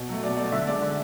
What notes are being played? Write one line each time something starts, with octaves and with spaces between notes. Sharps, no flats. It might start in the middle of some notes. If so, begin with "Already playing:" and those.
Already playing: B2
F#3 A3
B2 D5
F#3 A3 D5
D3 E5
G#3 D5
D3